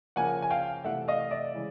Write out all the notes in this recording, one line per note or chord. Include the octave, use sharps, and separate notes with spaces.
C#3 F3 A#3 F#5 G#5
G#5
F5 G5
C3 E3 A3 E5 F#5
D#5 F5
D5 E5
C#3 E3 G#3